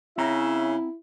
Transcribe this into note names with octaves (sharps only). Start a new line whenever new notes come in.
C#3 C4 C#4 E4 E5 F#5 A#5